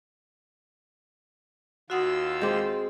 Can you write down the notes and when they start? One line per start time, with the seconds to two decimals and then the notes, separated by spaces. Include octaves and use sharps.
1.90 D#2 F4 F#4 F#5 D#6 E6
2.42 G#3 C4 D6 G6